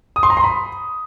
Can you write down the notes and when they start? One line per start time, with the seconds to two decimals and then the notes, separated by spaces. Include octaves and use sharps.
0.16 D#6
0.23 C6
0.30 A#5
0.37 C6
0.44 B5